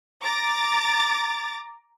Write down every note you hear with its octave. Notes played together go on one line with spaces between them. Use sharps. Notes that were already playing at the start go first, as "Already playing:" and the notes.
A#5 D6 A6